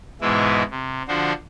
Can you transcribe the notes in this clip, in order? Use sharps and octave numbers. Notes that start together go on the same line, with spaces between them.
G#2 B2 E3 G#3 E4
C3
D3 F3 D4 F#4 C5